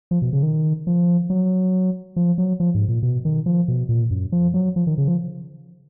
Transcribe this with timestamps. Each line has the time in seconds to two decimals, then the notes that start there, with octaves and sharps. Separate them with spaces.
0.11 F3
0.22 B2
0.33 C#3
0.43 D#3
0.87 F3
1.30 F#3
2.16 F3
2.38 F#3
2.60 F3
2.75 G#2
2.88 A#2
3.03 B2
3.25 D#3
3.46 F3
3.68 B2
3.89 A#2
4.11 F#2
4.32 F3
4.54 F#3
4.76 F3
4.87 D#3
4.98 C#3
5.08 F3